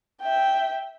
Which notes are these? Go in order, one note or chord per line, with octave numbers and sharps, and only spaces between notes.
E5 G5